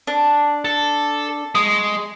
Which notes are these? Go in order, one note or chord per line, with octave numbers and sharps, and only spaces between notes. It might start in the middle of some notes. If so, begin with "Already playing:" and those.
D4
A4
G#3 C#6 D#6